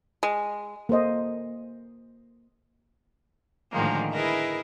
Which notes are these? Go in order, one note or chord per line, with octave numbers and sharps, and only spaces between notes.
G#3
A#3 A4 C5 D#5
A2 D3 D#3 F3 G#3 A#3
E4 G#4 A#4 B4 D#5 E5